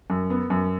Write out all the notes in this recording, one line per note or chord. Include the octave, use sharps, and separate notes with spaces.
F#2
B3
F#2